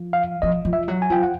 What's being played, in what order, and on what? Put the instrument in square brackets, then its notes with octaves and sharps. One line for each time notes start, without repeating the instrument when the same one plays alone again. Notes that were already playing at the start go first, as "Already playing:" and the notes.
Already playing: [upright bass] F3
[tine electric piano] F5
[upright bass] F3 [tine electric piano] D#5
[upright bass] F3
[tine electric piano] E5
[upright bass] F#3
[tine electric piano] G#5
[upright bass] F3 [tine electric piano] G5
[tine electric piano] F#5